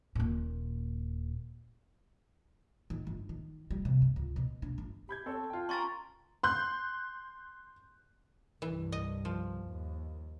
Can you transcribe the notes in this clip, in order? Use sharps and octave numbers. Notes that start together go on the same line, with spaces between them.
D#1 A#2
D#3
G1
D#3
G3
C3
G2
C#2
B2
D4
G1
G4 B5 G6 G#6
C4 A4 C#5 A5
F4 G5
C#4 G4 A#4 C6 C#6 A6
C6 F#6 G6
C2 G2 E3
D#5
F3
D#2